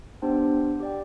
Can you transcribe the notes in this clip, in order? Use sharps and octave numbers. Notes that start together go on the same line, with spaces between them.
B3 D4 G4 C5 G5
G4 D5 G5